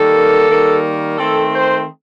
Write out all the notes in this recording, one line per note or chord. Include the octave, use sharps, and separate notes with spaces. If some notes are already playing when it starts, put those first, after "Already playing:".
Already playing: D#3 G3 A#3 A4
D#3 G3 A#3
D#3 A3 C4 A4
C5